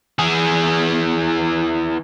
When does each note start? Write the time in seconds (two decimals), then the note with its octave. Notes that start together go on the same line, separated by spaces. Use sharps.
0.19 E3 G#4